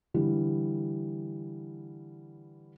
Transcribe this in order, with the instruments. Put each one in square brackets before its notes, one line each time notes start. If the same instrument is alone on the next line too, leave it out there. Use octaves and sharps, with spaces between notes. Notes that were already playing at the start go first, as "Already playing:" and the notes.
[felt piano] D3 E3 G3